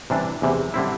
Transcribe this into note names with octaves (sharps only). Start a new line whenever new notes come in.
C3 E3 G3 D4
E2 C3 E3
D3 G3 C4 E4